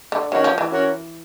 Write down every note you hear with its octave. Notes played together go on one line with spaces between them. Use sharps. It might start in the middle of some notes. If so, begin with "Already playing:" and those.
D3
D#3 C#4 F#4 A#4 C#5 F#5
F3
E3
C#4 F#4 A#4 C#5 F#5